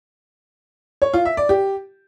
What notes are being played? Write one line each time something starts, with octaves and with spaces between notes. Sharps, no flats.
C#5
F4
E5
D5
G4